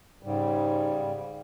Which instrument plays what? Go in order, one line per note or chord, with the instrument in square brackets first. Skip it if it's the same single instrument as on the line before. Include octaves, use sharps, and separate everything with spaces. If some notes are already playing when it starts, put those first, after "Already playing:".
[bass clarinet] G#2 [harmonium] C#3 G3